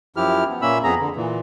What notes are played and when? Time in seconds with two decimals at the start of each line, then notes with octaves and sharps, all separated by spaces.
0.16 F#2 F3 E4 G4 F6
0.49 B3
0.62 A#2 A#3 C#4 E5 B5 E6
0.84 F2 B3 G#4 A#5
0.99 D3
1.16 A#2 E3